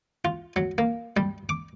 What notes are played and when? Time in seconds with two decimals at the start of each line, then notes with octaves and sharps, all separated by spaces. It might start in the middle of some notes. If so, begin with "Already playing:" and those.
0.25 F4
0.56 F#3
0.78 A#3
1.17 G3
1.49 D6